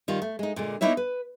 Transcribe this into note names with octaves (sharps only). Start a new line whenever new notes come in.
D#3 G3 F4
A3
G#3 D#4
A#2 D3 G#3
A#3 B3 D#4 E4 C#5 E5
B4